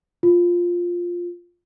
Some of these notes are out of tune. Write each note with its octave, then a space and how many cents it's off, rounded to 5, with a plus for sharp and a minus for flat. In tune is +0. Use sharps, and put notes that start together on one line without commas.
F4 +5